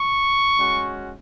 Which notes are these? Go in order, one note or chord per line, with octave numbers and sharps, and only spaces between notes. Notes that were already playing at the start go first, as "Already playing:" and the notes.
Already playing: C#6
G#3 C#4 F#4